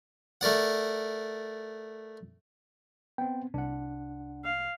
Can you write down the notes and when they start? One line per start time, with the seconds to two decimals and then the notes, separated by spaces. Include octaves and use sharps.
0.41 A3 A#4 D5 F#5
3.18 B3 C4 G5
3.54 C2 D4 F#5
4.44 F5